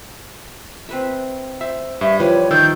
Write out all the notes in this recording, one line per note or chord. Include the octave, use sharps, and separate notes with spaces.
C4 B4 E5
C5 E5
G2 E5
E3 F3 G3 B4 C#5
D#3 D5 E6 G6